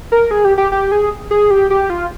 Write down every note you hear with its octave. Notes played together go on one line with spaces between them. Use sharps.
A#4
G#4
G4
G4
G4
G#4
G#4
G4
G4
F4